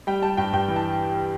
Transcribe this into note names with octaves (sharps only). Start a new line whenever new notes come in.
G3 G5
G3 A5
G2 G5
G2 G5
E3
A5